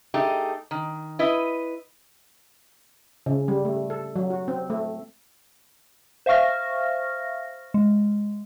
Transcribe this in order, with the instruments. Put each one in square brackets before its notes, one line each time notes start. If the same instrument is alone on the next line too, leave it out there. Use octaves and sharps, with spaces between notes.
[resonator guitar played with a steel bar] A3 D#4 G4 G#4
D#3
E4 B4 D#5
[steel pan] C#3
G3
A3
A4
F#3
F#4
C4
A3
[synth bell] C5 E5 F5 C#6 F6 A#6
G#3